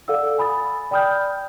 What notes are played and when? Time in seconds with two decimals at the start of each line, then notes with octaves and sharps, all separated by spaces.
0.08 A4 D5 F5 F#5 E6
0.38 G#5 B5 D#6 A6
0.91 D5 G5 B5 D#6 F6 G6